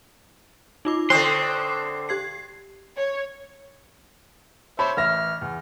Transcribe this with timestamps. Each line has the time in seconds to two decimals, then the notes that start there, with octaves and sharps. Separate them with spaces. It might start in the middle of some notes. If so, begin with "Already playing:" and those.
0.85 D#4 F4 D6
1.10 D3 C4 C5 C6 C#6 D#6 F#6
2.09 G4 G#6 C7
2.97 C#5
4.79 C5 C#5 E5 A5 B5
4.97 A1 E5 F6 A#6
5.42 E2